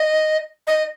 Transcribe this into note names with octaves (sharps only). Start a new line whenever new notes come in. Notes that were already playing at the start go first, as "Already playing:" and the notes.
Already playing: D#5
D#5